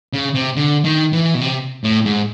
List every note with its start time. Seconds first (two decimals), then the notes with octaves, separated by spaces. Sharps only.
0.13 C#3
0.35 C3
0.56 D3
0.84 D#3
1.13 E3
1.34 B2
1.41 C3
1.84 A2
2.06 G#2